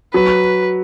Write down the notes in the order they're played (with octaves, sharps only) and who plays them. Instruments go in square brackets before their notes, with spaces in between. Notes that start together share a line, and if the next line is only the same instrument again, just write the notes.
[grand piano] F#3 [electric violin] B4